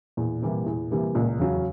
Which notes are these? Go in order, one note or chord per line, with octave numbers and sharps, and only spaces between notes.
E2 A#2
C3 E3 G3 A#3
E2
C3 E3 G3 A#3
C#2 A#2
E2 C#3 F#3